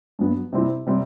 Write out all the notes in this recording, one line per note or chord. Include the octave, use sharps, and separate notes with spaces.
G2 F#3 B3
C3 G3 C4 E4
C3 G3 C4